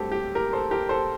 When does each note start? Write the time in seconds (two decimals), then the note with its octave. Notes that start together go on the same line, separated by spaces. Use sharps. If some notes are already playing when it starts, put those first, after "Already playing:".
Already playing: G2 F#3 A3 C4 G4 A4
0.12 G4
0.35 G4 A#4
0.53 A4 C5
0.71 G4 A#4
0.89 A4 C5